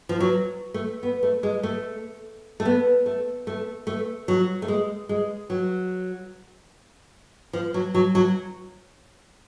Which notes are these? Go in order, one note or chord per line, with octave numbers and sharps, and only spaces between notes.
F3
F#3
A3
B3
A3
G#3
A3
A3
B3
A3
A3
A3
F#3
A3
G#3
G#3
F#3
F3
F#3
F#3
F#3